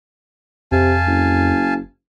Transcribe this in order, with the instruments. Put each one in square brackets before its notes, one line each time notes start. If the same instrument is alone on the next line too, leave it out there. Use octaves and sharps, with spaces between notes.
[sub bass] F2 [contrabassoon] C3 [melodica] F5 G#5 A5
[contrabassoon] F#1